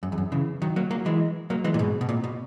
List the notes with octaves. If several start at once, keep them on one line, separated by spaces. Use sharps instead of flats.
F#2
E2
F#2
C#3 E3
D#3 F#3
F#3 A#3
F#3 A#3
E3 G#3
F#3 A#3
E3 G#3
A#2
G#2 B2
B2
A#2
B2